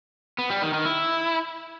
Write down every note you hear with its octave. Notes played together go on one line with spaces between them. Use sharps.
B3
G3
D#3
D#3
E4